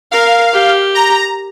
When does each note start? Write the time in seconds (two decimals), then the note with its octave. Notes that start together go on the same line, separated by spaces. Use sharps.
0.12 A#4 F5
0.53 G4
0.95 A#5